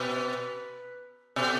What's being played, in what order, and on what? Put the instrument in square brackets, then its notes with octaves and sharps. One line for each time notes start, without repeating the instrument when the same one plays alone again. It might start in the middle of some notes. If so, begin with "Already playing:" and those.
Already playing: [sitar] B2 [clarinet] B4
[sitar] B2 [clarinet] A4